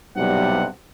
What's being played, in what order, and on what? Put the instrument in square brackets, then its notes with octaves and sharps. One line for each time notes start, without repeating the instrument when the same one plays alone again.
[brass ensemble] B1 G2 C3 G3 F#5